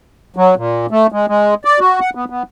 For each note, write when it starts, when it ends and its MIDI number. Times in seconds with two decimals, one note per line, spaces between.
0.37 0.55 54
0.57 0.86 46
0.91 1.07 57
1.12 1.26 56
1.28 1.54 56
1.65 1.79 74
1.80 2.00 66
2.00 2.10 78
2.15 2.25 59
2.30 2.43 59